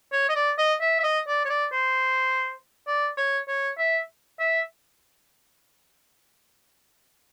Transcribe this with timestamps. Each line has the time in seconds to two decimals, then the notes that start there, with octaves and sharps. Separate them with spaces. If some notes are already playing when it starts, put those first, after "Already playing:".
0.13 C#5
0.29 D#5
0.36 D5
0.58 D#5
0.81 E5
1.00 E5
1.04 D#5
1.28 D5
1.45 C#5
1.50 D5
1.73 C5
2.87 D5
3.17 C#5
3.48 C#5
3.78 E5
4.40 E5